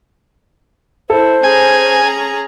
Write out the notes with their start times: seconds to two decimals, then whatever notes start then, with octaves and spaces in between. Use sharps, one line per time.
1.10 E4 A4 C5
1.43 C#4 G#4 G#5 A#5